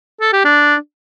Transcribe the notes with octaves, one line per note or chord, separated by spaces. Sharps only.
A4
G4
D4